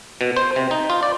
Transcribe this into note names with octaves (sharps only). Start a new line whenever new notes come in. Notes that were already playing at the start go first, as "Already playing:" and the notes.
B2
C5
C3
D#4
F4
D5